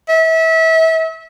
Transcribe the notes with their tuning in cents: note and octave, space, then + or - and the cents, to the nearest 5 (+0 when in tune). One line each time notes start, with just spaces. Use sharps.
E5 -30